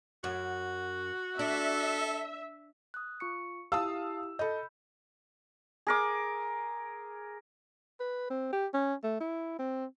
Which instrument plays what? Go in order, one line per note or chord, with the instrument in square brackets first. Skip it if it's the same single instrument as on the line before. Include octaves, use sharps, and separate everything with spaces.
[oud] F#2 [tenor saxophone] F#4
[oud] D4 [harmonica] A4 [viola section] E5
[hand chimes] D#6 F#6
F4 C#6 C#7
[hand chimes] E4 G4 [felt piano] F5 A5 D#6 [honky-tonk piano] E6
[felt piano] A4 D#5 [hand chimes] B5 G6
[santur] G#4 A#4 D6
[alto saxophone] B4
C4
G4
C#4
A3
E4
C4